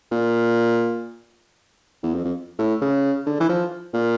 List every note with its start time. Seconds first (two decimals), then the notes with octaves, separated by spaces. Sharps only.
0.12 A#2
2.03 E2
2.14 F2
2.25 F2
2.59 A2
2.81 C#3
3.26 D3
3.40 E3
3.49 F3
3.94 A#2